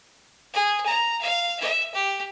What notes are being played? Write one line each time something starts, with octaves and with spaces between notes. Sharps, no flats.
G#4
A#5
F5
E5
G4